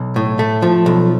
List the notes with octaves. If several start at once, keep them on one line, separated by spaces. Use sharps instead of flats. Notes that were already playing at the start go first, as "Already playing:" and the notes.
Already playing: B1
A2
A3
F3
B1